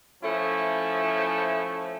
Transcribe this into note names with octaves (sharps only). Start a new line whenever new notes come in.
F3 A3 C#4 E4